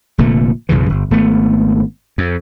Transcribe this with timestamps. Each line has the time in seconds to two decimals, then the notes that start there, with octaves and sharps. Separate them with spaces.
0.18 F1 A#2 D3 A3
0.69 B1 F#2 C#3 E3
0.90 G1
1.11 G#1 A3 B3
2.18 F2